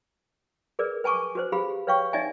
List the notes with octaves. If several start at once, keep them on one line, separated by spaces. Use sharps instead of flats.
G#4 A#4 B4 D5
B4 G#5 A5 C#6 D6
F#4 B4 C5
G4 G#4 F5 B5
B4 C#5 F5 G5 C#6
D#4 D5 E5 G#5